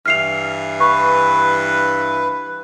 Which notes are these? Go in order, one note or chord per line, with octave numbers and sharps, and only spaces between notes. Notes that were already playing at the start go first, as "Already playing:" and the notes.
G2 E3 F6 C7 F7
B4 C#6